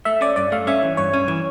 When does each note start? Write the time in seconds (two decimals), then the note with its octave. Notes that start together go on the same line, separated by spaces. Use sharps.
0.05 A3 E5
0.21 C#4 D5
0.36 G2 D5
0.52 A3 F5
0.67 C#4 E5
0.83 E3
0.97 G2 C#5
1.13 C#4
1.28 E3